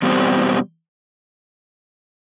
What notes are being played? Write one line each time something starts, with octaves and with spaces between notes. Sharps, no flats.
E2 B2 G3 C4